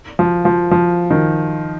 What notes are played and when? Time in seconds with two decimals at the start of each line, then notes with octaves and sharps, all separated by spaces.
0.19 F3
0.45 F3
0.71 F3
1.11 D#3